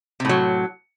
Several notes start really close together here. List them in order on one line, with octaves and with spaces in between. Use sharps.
C3 A2 F#3